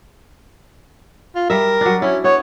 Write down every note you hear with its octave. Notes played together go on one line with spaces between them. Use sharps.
F4
G3 A#4 E5
F#3 D4
C#4 E4
B3 C#5